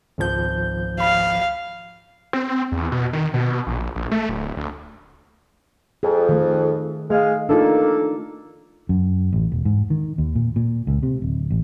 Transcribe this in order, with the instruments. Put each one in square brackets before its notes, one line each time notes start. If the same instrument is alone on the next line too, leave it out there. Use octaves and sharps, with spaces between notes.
[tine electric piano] G#1 F3 [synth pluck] C#2 G6
[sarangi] F5 [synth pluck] B5
[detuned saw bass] C4
E2
B2
D#3
B2
A#1
A#1
A3
D1
D2
[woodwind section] F2 [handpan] G#4
[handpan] D#3 A3
[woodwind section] G#3 G#4 F5 [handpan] A3
[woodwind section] A#3 A4 [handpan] D4 D#4 F4
[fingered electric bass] F#2
A1
E1
G#2
D#3
D#2
A#2
A#2
C#2
C3
D1
A1